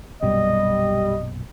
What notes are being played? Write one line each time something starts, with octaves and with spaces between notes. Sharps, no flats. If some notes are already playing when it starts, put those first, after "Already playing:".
A#1 F#2 B2 G3 D#5